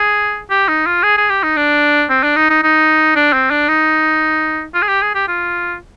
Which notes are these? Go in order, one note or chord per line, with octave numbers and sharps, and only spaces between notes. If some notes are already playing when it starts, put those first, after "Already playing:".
Already playing: G#4
G4
D#4
F4
G#4
G#4
G4
D#4
D4
C4
D4
D#4
D#4
D#4
D4
C4
D4
D#4
F4
G#4
G4
G#4
G4
F4